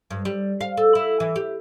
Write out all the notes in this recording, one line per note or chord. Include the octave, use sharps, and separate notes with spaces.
G2
G3
F5
A4
E4
E3
G4